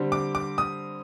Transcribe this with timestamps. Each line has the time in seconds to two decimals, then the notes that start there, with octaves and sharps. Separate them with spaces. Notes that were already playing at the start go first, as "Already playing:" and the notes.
Already playing: D3 G3 C4
0.12 D6
0.35 D6
0.58 D#6